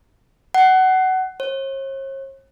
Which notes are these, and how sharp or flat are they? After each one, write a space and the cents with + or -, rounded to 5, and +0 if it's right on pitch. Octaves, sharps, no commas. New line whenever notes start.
F#5 +20
C#5 -45